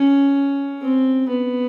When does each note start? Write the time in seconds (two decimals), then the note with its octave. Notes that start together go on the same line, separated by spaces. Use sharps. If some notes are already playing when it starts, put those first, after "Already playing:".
Already playing: C#4
0.81 C4
1.29 B3